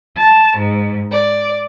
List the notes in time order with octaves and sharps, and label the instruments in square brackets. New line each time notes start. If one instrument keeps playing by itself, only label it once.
[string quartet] A5
G#2
D5